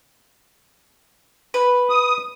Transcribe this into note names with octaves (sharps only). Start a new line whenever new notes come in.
B4
D#6